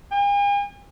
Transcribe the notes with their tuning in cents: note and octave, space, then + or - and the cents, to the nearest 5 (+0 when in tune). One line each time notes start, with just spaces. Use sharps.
G#5 -45